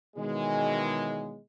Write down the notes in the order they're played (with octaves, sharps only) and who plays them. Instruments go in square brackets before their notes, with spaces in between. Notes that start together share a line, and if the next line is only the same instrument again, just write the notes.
[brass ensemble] B2 D#3 E3 F#3 G#3